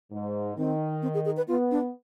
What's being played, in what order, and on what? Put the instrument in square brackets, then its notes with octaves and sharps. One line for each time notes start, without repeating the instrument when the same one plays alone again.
[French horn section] G#2
[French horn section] D#3 [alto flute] C4
[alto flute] C4
G#4
G#4
B4
[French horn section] B3 [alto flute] F4
[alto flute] D4